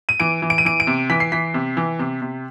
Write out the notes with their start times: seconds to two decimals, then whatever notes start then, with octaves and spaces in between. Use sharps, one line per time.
0.09 D#7
0.20 E3 D7
0.42 E3
0.50 D7
0.58 D#7
0.65 E3 D7
0.80 D7
0.87 C3
1.10 E3 B6
1.20 C7
1.32 E3 B6
1.54 C3
1.77 E3
1.99 C3
2.22 C3